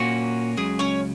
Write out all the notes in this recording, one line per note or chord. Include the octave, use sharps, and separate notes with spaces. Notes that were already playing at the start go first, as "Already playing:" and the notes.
Already playing: A#2 A#3 C#4 F#4
C#2 C#3 F#3 G#4
C#4 C#5